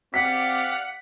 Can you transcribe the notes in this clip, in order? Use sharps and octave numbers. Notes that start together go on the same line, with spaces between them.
C4 G4 D5 F5 F#5 B6